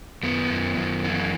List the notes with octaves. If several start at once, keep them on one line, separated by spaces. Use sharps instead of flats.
F#2 B3
F#2
F#2
E3